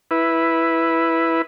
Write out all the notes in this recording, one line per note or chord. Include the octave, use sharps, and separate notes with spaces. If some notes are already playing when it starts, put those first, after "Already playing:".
E4 B4